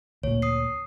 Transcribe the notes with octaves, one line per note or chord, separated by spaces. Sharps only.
D2 A#2 C#5
D#6 C7